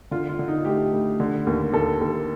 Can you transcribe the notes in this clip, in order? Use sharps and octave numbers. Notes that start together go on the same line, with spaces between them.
D3 F4
F4
D3
D#4
A3 G4
D2
D3
D#2
D#2 A4
D#2